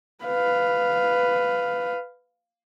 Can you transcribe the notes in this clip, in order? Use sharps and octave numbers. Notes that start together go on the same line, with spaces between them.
B4 F5